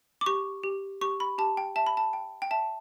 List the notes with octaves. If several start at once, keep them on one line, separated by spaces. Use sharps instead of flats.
D6
G4 C#6
G4
G4 C#6
B5
G4 A5
G5
E5 A5
B5
A5
G5
G5
E5 A5